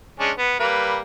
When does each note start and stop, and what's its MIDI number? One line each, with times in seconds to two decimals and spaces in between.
0.20 0.32 56
0.20 0.32 61
0.20 0.32 62
0.38 0.57 59
0.60 1.01 55
0.60 1.01 58
0.60 1.01 71